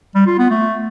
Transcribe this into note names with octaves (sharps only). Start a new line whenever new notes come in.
G3
F4
B3
A3